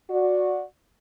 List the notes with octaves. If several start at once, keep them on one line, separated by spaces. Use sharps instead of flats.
F#4 D5